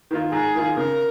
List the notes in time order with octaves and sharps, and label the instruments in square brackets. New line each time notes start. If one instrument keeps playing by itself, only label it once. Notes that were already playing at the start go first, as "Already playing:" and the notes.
[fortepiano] D#3 A#3 F4
[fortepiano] G#2 [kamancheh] G#4
[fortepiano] D#3 A#3 F4
[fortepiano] C#3 [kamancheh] A#4